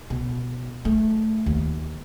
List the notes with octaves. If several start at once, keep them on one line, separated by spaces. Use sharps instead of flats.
B2
A3
D#2